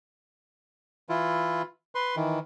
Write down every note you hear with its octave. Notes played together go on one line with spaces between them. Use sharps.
E3 E4 F4
B4 C6
D#3 E3